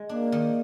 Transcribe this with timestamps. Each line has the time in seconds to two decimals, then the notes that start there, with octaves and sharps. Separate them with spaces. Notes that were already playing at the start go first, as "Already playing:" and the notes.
Already playing: G#3
0.09 A#3 D4
0.32 D#3